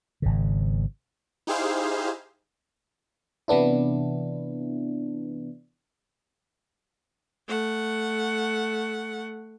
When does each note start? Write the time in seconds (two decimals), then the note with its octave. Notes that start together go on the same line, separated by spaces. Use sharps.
0.22 G#1 C#3
1.47 D#4 E4 G4 G#4 C5 F5
3.48 C3 E3 B3 D4 E4
7.48 A3 F#5